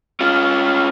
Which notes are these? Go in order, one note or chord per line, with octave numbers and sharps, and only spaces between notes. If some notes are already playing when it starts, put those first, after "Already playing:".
C#4 F4